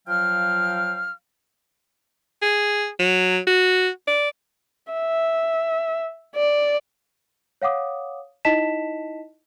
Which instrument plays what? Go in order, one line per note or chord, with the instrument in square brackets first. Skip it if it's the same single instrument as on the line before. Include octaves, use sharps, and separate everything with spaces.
[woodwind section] F3 F#3 F5 G5 F6
[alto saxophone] G#4
F#3
F#4
D5
[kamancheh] E5
D5
[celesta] C#5 F5 F#5 D6 D#6
D#4 E4 D#5 A5 B6 E7